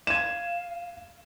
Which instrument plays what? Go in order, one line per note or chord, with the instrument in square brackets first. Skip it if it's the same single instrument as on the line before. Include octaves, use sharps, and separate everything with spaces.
[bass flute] F5 [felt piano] G#6 D#7 E7